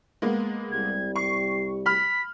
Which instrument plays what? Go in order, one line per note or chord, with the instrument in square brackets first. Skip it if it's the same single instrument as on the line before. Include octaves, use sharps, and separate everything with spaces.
[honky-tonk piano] G#3 A#3 B3
[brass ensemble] C2 G3 [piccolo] G#6
[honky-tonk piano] C#6 [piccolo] C7
[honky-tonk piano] B5 F6 [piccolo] B6